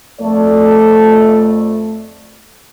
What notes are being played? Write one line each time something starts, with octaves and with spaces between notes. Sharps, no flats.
F2 A3 D5